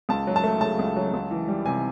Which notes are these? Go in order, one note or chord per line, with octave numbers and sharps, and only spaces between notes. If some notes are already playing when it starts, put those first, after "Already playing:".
C#2 A5
F#3
A5
A3
C#3 A5
C#2
F#3
C#2
E3
G3
C3 G#5